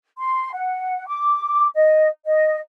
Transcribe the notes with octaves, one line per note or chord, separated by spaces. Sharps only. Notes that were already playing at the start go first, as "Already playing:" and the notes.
C6
F#5
D6
D#5
D#5